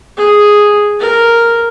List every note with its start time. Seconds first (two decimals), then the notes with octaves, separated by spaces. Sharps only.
0.17 G#4
1.00 A#4